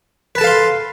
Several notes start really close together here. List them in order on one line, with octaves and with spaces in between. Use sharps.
B4 A5 A4 F5 C6